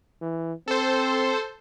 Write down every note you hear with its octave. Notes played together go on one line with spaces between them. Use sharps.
E3
C4 A4 C5